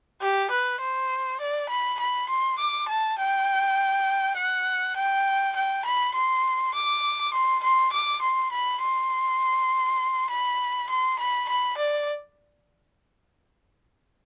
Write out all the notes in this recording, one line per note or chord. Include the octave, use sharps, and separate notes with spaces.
G4
B4
C5
D5
B5
B5
C6
D6
A5
G5
F#5
G5
G5
B5
C6
D6
C6
C6
D6
C6
B5
C6
B5
C6
B5
B5
D5